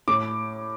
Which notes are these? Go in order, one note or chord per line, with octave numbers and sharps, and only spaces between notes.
A2 D6